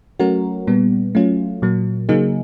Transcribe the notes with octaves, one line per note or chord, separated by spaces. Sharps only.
F#3 A3 C#4 F#4 A#4
A#2 G3 B3
F#3 A3 C#4 F4
A#2 F#3 A#3
C#3 F#3 A#3 D#4 G#4